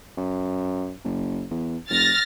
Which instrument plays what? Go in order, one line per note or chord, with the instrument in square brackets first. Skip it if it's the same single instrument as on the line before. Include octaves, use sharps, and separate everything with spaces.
[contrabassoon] F#2
F#1
E2
[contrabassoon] F1 [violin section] F6 A6 A#6